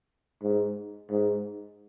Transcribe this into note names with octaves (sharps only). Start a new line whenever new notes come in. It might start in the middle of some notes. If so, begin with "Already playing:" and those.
G#2
G#2